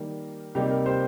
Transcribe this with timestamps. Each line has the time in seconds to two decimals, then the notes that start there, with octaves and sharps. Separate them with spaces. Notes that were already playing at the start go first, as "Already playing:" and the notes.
Already playing: D#3 G3 A#3 A#4
0.55 C3 G3 A#3 D#4 G4
0.71 A#4
0.86 G4 C5